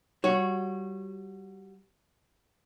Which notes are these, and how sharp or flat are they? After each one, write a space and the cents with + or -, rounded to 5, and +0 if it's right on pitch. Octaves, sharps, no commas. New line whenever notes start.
G3 -20 F#4 -15 C#5 +0